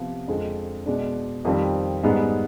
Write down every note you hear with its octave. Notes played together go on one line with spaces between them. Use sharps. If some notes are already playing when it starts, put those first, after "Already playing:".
Already playing: C3 F3 B3
F2 D3 G#3
B2 G#3 D4
F2 D#3 G3 C4
G#2 G3 B3 D#4 G#4